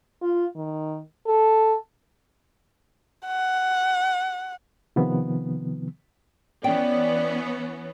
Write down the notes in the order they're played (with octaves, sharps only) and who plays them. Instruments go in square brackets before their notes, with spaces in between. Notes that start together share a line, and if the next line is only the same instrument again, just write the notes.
[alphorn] F4
D#3
A4
[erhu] F#5
[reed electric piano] C3 D#3 F3 B3
[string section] E3 B3 C#4 [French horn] D5 [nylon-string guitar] G5